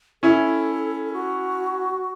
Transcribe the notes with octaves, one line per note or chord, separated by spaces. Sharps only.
C#4 E4 A4
F#4